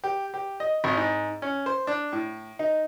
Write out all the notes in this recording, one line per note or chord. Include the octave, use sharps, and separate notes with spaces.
G4
G4
D#5
G#1
G#2
C#4
C5
D4
A2
D#4